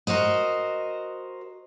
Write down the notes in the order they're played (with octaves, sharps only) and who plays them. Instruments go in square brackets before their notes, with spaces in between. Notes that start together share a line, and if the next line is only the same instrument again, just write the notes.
[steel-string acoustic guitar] F#4 A#4 C5 D#5